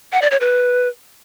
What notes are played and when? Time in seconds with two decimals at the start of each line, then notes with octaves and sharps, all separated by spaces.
0.12 F#5
0.22 D5
0.31 C#5
0.40 B4